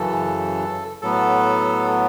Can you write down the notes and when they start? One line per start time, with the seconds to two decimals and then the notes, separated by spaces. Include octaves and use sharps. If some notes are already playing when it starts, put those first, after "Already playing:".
Already playing: F#2 C#3 E3 A4
1.02 A2 F#3 B3 A4